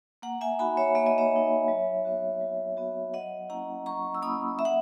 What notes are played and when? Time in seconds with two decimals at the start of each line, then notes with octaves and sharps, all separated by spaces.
0.22 A#3 F#5 A#5
0.41 E5 G#5
0.59 D#4 F#4 G#5 B5
0.77 C#5 E5
0.95 A#3 E5
1.06 D#5
1.18 C#5 E5
1.31 D#4 F#4
1.68 F#3
2.05 B3 F#4
2.41 F#3
2.77 B3 F#4
3.13 F#3 D#5 F#5
3.49 A#3 C#4 E4 F#5 A#5
3.86 F#3 A#5 C#6
4.15 E6
4.22 A#3 C#4 E4 B5 D#6
4.59 A#3 E5
4.65 F#5